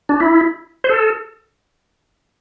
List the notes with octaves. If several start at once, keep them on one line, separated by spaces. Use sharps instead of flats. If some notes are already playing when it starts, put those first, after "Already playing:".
D4
E4
C5
A4